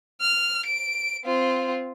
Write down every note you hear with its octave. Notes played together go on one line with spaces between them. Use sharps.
F6
D7
C4 F4